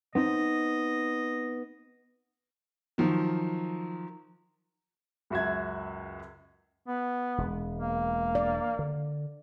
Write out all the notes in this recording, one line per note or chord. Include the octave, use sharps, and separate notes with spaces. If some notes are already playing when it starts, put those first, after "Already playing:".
B3 C4 D#4 D#5
D#3 F3 F#3
C#2 F#2 F#4 E5 G#6
B3
E1 G#3
A#3
D5
D3